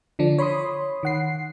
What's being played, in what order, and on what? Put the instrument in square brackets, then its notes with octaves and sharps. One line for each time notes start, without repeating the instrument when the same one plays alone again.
[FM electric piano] D3 F3 D4
C#5 B5 C6 D#6
D#3 F#5 C7